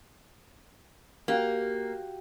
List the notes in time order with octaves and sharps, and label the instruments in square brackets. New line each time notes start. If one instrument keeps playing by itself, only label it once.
[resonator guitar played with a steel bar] A#3 [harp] F#4 G4 F5